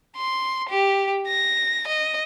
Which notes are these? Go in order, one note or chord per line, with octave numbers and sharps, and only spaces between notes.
C6
G4
A#6
D#5